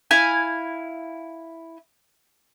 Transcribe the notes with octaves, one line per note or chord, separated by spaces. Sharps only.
E4 F5 G#5